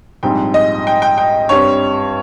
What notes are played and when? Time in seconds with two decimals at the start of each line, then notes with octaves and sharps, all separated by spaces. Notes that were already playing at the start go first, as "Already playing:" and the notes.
0.23 A#1 G#2 G3 C4 G5
0.54 D#5
0.87 G5
1.02 G5
1.18 G5
1.49 G2 G3 C4 C#5